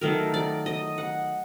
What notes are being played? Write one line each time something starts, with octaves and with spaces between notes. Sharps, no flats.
D#3 F#3 A3 A#4
D5
D#5
F#5